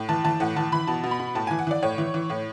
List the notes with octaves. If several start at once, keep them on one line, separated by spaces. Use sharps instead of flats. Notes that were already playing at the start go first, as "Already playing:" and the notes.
Already playing: A2
E3 A5
E3 A5
A2 F#5
E3 A5
E3 B5
B2 A5
B2
B5
B2
A2 A5
E3 G#5
F#5
E3 D5
A2 C#5
E3
E3
A2